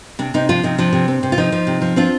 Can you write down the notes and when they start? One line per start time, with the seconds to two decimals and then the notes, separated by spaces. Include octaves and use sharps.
0.19 C3 D4
0.34 C3 D#4
0.49 F3 D4 F4
0.63 C3 D#4
0.78 F3 D4
0.93 C3
1.08 C4
1.23 C3
1.32 F4
1.38 F3 D#4
1.52 F3
1.67 C3
1.82 F3
1.96 C4 D4 F4